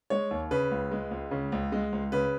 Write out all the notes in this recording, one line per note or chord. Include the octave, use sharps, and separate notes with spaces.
G#3 C#5
D#2
C#3 B4
C#2
G#3
C#2
C#3
C#2
G#3
C#2
C#3 B4